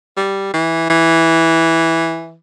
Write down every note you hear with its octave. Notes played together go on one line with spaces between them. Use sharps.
G3
E3
E3